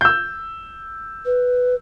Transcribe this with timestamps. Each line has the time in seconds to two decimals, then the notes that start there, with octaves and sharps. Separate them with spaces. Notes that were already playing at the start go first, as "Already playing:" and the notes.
0.01 E6 G6
1.26 B4